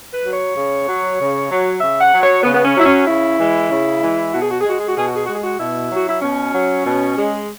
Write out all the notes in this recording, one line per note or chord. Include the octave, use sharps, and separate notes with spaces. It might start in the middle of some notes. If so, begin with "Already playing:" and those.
B4
F#3
C#5
C#3
F#3
C#3
F#3
C#3 E5
F#5
F#3
C#5
C#3 B3
B3
C#4
F#3
E4
C#4
C#3 E4
E3 G#3
C#3
E3 G#3
B2 F#4
G#4
F#4
G#3 G#4
F#4
G#4
F#4
B2 G#4
F#4
G#4
G#3 F#4
G#4
F#4
B2 E4
F#3
F#4
E4
B2 C#4
F#3
B2
G#3